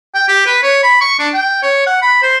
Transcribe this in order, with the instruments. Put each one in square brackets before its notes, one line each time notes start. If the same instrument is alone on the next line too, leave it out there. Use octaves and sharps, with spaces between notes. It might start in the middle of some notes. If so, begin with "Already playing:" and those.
[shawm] G5
G4
B4
C#5
B5
C#6
D4
G5
C#5
F#5
B5
C5